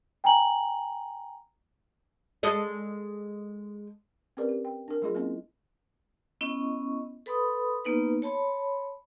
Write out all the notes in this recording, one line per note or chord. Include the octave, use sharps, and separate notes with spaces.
G5 G#5 A#5 F#7
G#3 A4 D#5
C4 C#4 G4 A#4 B4 D5
G4
G5
D4 A#4
F#3 A3 F4 G#4 D#5
A#3 C4 C#4 E4 D#5
B3 C#4 E4 D#5 C#6
A4 B4 B5 C6 D#6
A#3 B3 D#4 B4
C#5 A5 B5 C6